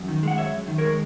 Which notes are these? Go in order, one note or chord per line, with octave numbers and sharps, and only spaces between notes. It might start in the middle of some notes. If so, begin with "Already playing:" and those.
Already playing: F#2
D#3
G#3 F#5
F#2 C#5 E5
F#2
D#3
A#4 C#5
G#3